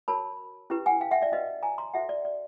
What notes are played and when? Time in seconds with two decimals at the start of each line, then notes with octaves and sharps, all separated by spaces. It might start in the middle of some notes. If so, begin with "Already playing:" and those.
0.08 F#4 A#4 C#5 A5 B5
0.70 C#4 E4 G4 B4
0.86 F#5 G#5
1.01 F5 G5
1.11 E5 F#5
1.22 D5 E5
1.32 C#4 F#4 B4 D#5 F5
1.63 G#5 A#5
1.78 A#5 C6
1.94 F#4 A4 C5 E5 F#5
2.09 D5
2.25 D5